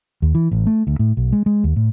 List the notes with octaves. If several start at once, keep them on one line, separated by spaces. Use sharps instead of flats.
D#2
E3
A1
A3
D2
A2
B1
G#3
G#3
D#2
A2